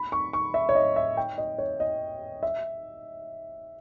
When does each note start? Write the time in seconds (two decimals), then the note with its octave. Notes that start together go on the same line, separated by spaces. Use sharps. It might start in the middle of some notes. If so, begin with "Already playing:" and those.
Already playing: B5
0.12 C#6
0.33 C#6
0.54 E5
0.69 C#5
0.75 D#5
0.96 E5
1.17 G5
1.38 D#5
1.58 C#5
1.80 D#5
2.43 E5